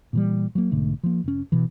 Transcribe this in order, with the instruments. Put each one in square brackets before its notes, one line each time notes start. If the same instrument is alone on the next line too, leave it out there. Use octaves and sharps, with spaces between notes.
[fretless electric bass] A#2 E3 G3
F#3 A#3
B1 G#2 D3 A3
F3 A#3
F1 C#4
B2 E3